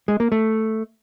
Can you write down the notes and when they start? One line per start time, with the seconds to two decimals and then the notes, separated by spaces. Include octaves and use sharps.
0.08 G#3
0.20 A#3
0.32 A3